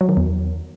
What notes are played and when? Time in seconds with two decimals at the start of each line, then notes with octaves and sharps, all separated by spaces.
0.01 F#3
0.09 D#3
0.17 E2